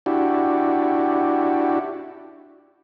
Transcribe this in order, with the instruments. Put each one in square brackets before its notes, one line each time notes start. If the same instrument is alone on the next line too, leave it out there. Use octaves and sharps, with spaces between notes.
[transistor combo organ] D4 E4 F#4 G4